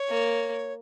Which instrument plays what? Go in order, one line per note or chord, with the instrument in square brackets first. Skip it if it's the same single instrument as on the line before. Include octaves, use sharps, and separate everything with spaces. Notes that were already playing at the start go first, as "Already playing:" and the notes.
Already playing: [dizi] C#5
[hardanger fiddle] A#3